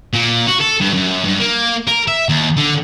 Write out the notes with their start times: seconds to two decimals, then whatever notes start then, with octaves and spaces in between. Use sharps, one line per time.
0.13 A#2
0.48 F#4
0.61 A4
0.81 G2
0.94 F#2
1.25 G2
1.40 A#3
1.88 A#4
2.08 E5
2.29 D#2
2.57 D3